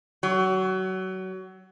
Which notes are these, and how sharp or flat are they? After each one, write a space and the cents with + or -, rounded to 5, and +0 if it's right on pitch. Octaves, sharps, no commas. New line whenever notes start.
F#3 +25